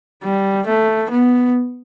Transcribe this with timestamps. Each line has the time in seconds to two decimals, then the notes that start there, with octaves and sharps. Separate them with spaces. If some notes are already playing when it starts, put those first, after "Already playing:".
0.24 G3
0.67 A3
1.11 B3